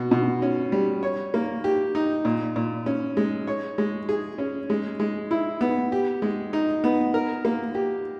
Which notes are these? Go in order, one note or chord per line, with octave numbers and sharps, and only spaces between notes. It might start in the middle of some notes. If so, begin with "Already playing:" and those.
Already playing: B2
B2
C#4
G3
C#5
A#3
G4
D#4
A#2
A#2
C#4
G#3
C#5
G#3
G#4
C#4
G#3
G#3
E4
B3
G4
G#3
D#4
B3
A#4
A#3
G4